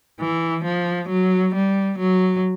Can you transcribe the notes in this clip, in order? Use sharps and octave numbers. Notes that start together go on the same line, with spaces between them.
E3
F3
F#3
G3
F#3